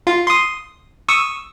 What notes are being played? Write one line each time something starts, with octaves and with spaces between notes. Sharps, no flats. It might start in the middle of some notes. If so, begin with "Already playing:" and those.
F4
C6 D#6
C#6 D#6 E6